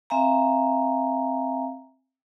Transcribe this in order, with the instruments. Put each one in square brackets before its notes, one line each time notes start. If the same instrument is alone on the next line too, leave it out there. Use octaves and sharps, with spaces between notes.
[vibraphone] C4 E5 F5 G#5 A#5